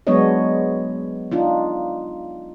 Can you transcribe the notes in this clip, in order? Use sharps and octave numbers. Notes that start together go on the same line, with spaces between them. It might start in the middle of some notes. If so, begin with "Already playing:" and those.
F#3 G#3 B3 D4 C#5 D#5
D4 D#4 F4